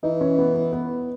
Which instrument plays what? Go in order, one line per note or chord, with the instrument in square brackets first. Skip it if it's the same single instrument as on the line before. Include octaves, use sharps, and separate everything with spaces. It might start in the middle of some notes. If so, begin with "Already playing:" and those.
[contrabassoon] E3 [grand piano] D#4
[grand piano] C#4
B3
B3
B3